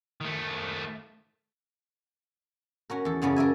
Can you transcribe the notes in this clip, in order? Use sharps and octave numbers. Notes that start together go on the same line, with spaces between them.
D#3 A3
C#4 F#4 A#4
E2 A4
F#2 C#3 B3 C#4 D5
A#4 D5 E5 G#5